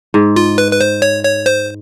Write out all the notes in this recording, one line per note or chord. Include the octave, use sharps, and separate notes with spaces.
G#2
F4
B4
B4
C5
C#5
C#5
C5